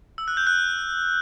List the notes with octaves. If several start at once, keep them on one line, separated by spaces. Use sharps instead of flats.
E6
F#6
G6
F#6